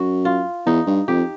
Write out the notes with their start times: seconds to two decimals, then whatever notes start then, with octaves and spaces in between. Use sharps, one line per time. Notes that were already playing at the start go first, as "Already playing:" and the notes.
Already playing: F#2 F#4
0.25 F4
0.66 E2 D#4
0.87 G2
1.08 F2 G4